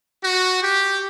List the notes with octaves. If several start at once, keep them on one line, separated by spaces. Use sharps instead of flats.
F#4
G4